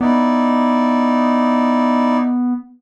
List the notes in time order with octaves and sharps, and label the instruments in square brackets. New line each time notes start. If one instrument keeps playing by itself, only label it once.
[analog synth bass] B3 [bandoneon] D#4 E4 D5